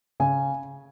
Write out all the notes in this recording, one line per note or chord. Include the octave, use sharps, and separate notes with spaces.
C#3 G#5